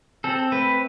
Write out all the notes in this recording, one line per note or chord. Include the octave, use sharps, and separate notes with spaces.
C4 A4
A3 B4